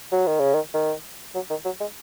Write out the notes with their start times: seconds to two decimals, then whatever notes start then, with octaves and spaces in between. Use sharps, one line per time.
0.12 F#3
0.27 D#3
0.40 C#3
0.54 D#3
0.74 D#3
1.35 F#3
1.50 D#3
1.65 F#3
1.80 G#3